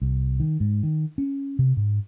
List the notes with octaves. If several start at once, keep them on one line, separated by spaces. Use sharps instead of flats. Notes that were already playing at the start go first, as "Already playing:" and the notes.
C2
D#3
G#2
D#3
C#4
C3
G#2